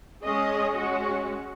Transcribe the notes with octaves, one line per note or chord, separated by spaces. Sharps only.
G#3 C#4 G#4 D#5
G#3 C#4 F#4